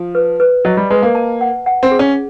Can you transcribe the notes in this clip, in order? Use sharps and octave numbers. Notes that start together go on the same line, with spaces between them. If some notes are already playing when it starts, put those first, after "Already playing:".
Already playing: F3
B4
B4
F#3 D#5
G3
G#3 B4
A#3
A5
F#5
F#5
C4
G#4
C#4